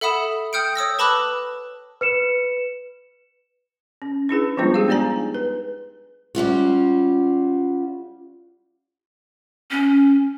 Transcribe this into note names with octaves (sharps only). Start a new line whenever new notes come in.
A4 E5 F#5 B5 D#6 E7
G5 D#6 F6 G6 C#7 D7
C#5 D#6 E6 A#6
B4 A5 B5 D6 E6 F#6
B4 C#7 E7
C#4
D4 E4 G#4 B4
F3 G3 G#3 B3 D4 F4
G4 G#4 F5
B3 D4 D#4 D5 G#5 A#5
B4
G3 C#4 F4 F#4
C#4